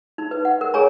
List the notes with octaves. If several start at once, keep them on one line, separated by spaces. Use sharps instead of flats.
D#4
B4
F#5
A#4
G#4 C#5 G#5 A#5